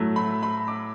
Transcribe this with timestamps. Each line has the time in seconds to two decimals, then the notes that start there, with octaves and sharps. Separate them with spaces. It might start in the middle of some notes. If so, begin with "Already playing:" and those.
Already playing: A2 F#3 A3
0.16 B5
0.43 B5
0.68 D6